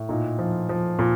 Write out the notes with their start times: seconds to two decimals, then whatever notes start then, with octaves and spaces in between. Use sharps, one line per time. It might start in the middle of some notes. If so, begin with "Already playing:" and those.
Already playing: A2
0.09 A#2 D#4
0.39 F3
0.69 F3
0.99 A#2